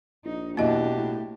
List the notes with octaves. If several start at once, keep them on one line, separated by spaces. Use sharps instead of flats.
A#1 D#4
B1 E2 A#3 D4 E4 F#4 G4 D#5
A2